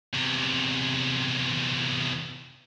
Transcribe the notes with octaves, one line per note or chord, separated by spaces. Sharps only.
E2 C3